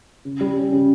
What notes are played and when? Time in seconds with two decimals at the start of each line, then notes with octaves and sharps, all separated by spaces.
0.25 C#3
0.41 G3
0.56 C#4
0.72 C#3